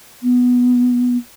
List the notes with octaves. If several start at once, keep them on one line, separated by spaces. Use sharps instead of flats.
B3